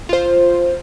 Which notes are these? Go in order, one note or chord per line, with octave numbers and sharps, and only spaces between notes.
F4 C5